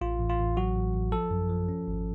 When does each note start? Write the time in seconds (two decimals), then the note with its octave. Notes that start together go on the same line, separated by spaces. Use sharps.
0.01 A1 F4
0.20 A1
0.30 F4
0.38 A1
0.57 F#3 F#4
0.75 A1
0.94 A1
1.12 F3 A4
1.31 F#2
1.49 F3
1.69 C#4
1.87 G#1